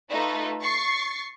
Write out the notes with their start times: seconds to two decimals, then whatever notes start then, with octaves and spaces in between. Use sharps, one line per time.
0.10 A3 D#4 F4 A4 B4
0.62 C#6 A6 C7